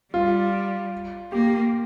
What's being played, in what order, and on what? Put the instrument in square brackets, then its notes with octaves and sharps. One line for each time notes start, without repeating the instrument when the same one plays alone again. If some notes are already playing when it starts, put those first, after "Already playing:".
[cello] G3 [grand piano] F4
[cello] A#3 [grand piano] G4